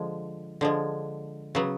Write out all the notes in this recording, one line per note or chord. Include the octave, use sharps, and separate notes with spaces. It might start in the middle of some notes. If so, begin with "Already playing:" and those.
Already playing: D3 F3 G#3
D3 F3 G#3
C#3 F#3 B3